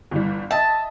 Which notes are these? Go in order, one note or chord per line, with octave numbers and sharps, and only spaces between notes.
G1 E3 G3
D#5 E5 A5